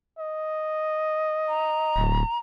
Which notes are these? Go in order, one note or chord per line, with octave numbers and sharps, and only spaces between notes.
D#5
A#5
D1